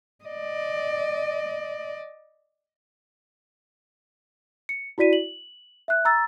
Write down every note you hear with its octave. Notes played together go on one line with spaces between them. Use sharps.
D5 D#5
C#7
E4 F#4 D5 B6 D#7
F#7
E5 F#6
A#5 E6 A6